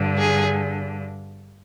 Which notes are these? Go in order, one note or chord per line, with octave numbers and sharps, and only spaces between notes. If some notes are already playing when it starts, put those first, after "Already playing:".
Already playing: G2 D3
G#4